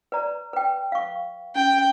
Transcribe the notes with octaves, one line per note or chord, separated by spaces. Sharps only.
B4 D5 A#5
B4 G5
F5 C#6
C#4 G5